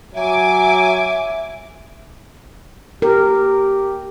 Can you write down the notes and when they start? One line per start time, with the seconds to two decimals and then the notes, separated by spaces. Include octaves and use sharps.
0.14 F#3 E5 G#5 D6
3.02 G4 A#4